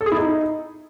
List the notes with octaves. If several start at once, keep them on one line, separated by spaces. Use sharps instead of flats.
A4
G#4
E4
D#4